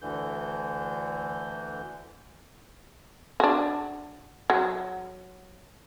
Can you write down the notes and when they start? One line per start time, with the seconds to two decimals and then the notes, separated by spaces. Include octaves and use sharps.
0.02 D2 D3 E3 G6
3.40 D4 F#4
4.50 F#3